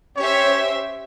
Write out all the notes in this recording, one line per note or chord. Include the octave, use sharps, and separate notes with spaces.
C#4 G4 C5 C#5 E5